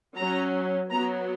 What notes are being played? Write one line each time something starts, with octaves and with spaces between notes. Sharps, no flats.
F#3 C#4 A#5
F#3 B3 A#5